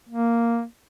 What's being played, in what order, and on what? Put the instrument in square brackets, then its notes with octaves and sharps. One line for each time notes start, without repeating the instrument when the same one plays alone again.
[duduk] A#3